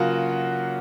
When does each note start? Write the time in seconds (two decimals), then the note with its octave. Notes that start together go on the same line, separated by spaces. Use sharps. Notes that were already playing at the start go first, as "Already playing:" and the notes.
Already playing: C#3 F#3 A#3 F4 F#4